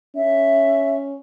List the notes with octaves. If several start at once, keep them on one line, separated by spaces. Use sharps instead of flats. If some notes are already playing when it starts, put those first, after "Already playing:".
C#4 E5